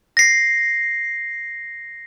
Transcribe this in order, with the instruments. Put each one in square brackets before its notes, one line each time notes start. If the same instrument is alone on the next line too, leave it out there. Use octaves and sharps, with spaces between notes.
[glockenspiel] A#6 C7